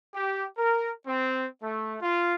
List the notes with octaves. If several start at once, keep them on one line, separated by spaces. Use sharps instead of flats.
G4
A#4
C4
A3
F4